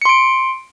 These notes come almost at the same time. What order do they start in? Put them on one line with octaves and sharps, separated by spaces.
C#7 C6 D7